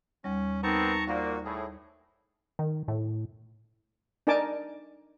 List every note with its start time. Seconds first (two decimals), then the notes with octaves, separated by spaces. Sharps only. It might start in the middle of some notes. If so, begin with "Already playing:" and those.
0.24 D#2 G3 C#4
0.63 B3 C4 D#4 A#4 A5 A#5 C#6
1.08 A#2 A#3 F#4 C5 D5
1.45 A2 G#4
2.59 D#3
2.88 A2
4.27 D4 D#4 A#4 G#5 A5 D6